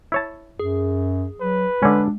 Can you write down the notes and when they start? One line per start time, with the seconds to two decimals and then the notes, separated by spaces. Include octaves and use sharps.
0.12 E4 C#5 A5
0.59 F#2 G#4
1.40 F#3 B4
1.83 D3 G#3 C#4 D4